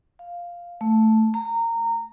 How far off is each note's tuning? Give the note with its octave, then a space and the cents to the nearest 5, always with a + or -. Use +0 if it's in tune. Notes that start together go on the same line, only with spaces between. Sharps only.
F5 +0
A3 +0
A#5 -20